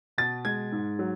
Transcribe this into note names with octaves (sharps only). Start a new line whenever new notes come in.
B2 A6
G#3 G#6
G#2
F#3